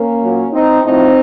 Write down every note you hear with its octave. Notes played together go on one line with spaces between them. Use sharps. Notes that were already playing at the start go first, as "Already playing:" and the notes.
Already playing: A#3 C#4
A#2 F#3
C4 D#4
A2 F3 C4 D#4